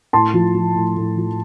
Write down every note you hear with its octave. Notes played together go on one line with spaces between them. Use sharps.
A2 A5 C6
F3
F3
A2
A2
F3